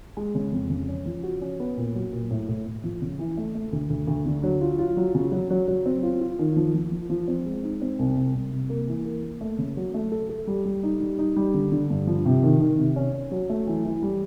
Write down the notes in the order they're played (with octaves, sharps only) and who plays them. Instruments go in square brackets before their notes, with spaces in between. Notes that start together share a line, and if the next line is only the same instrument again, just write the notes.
[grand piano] G#3
C#3
F2
C#3
C#4
F3
F#4
C#4
B3
A#2
F#3
A#2
A2
A2
A2
F3
C#3
E3
A3
A3
D2
D2
D2
D3
F#3
F4
F4
F#3
C#3
F#3
F#3
F#3
C4
F4
F4
D#3
F3
F3
F3
F3
C4
G#3
D#4
C4
C2
C2
C2
C2
A#3
E3
A#3
A#3
A3
C#3
F#3
A3
A4
A4
G3
G3
D#4
G3
D#4
G3
D3
D3
G2
F3
C3
D#3
D#3
C3
C#4
C#4
F#3
A3
E3
E3
G3